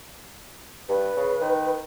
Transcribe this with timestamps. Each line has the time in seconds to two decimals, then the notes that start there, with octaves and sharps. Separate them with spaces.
0.89 G2 B4
1.17 C#3
1.41 D#3